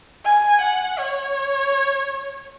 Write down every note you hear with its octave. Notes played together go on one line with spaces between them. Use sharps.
G#5
F#5
C#5